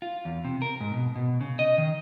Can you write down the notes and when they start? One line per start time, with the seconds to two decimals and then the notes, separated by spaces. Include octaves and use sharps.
0.02 F4
0.25 E2
0.45 C3
0.62 A#4
0.81 G#2
0.94 B2
1.16 B2
1.41 C#3
1.59 D#5
1.78 D#3